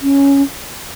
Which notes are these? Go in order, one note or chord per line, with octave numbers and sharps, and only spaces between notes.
C#4